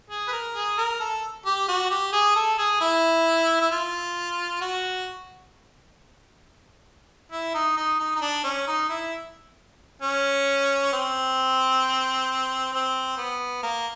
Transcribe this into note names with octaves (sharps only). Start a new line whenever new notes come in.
G#4
B4
A#4
G#4
A#4
A4
G4
F#4
G4
G#4
A4
G#4
E4
E4
F4
F#4
E4
D#4
D#4
D#4
D#4
D4
C#4
D#4
E4
C#4
C4
C4
B3
A#3